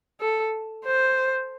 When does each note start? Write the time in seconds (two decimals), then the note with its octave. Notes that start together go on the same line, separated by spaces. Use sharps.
0.20 A4
0.85 C5